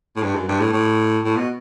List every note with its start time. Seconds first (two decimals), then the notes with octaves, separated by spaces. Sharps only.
0.16 A2
0.23 G2
0.35 F#2
0.48 G2
0.61 A2
0.73 A2
1.24 A2
1.36 B2